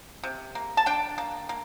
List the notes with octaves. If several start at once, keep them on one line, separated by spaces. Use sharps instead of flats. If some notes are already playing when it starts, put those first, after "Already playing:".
C3
A#3
A5
D4 G5
A#3
A#3